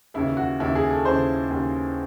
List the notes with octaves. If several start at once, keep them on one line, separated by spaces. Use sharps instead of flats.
D#2 C#3 E3 E4
F#4
D#2 C#3 E3 E4
G#4
A4
D#2 C#3 E3 C5
D#2 C#3 E3